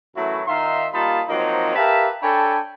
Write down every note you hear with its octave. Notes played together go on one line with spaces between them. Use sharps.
F#2 E3 F#3 A3 E4 F#4
D#3 D#4 F4 E5 F5 C6
G3 A#3 D#4 F4 A5 B5
F3 F#3 A#3 C4 D#4
G4 A#4 B4 E5 F5 A5
D4 A4 C#5 G5 G#5 B5